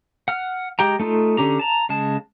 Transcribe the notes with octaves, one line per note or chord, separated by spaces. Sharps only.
F#5 F6
G#3 G4 G5 A#5
A3 D#4 F4 A4
D3 C#4 G4 A#5
A5 A#5
C#3 G#3 A5